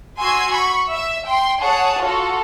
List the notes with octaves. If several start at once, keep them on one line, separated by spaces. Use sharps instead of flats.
F#4 G#5 C6 E6 G#6 C7
B5 C#6
E5 E6
G5 C6
G#4 C#5 F#5 A5
F4 F#4 A4